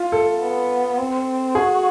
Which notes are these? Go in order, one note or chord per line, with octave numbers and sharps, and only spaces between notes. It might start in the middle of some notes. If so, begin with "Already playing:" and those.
Already playing: F4
A4
B3
C4
F#4 G#4